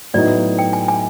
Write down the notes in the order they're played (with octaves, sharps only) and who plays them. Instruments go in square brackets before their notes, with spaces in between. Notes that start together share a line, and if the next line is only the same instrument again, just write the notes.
[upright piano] A2 F#3 B3 D#4 [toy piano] D5
[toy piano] G5
G#5
G#5